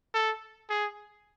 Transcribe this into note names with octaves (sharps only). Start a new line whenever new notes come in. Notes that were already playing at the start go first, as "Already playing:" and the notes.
A4
G#4